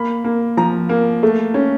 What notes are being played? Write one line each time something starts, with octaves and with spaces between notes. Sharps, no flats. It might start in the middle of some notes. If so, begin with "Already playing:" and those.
Already playing: A#3 B5
A#3
F3 A#5
A#3
A3
C#4